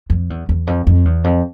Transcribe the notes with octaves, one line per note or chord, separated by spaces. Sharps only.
F2
E2
E2
F2
F2
E2
F2